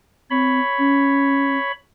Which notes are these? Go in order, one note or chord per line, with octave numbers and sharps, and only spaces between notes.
C4 C#5 B5
C#4